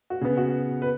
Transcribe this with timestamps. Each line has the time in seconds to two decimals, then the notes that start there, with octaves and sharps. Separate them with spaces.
0.10 F#4
0.22 C#3 B3
0.37 F#4
0.82 B4